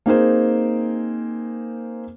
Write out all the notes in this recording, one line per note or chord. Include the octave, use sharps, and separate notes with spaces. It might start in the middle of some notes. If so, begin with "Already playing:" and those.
A#3 C4 D#4 G#4 A#4 C5